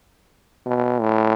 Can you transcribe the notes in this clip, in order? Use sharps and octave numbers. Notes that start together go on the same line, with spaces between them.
B2
A2